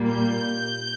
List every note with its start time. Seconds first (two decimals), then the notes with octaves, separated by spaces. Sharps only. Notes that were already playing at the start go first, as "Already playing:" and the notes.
Already playing: A#2 G3 A#3
0.10 G6